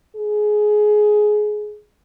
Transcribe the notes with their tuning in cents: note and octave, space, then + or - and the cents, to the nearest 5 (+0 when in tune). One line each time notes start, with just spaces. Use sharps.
G#4 +15